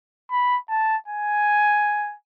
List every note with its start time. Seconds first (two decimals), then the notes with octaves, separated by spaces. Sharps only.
0.31 B5
0.70 A5
1.08 G#5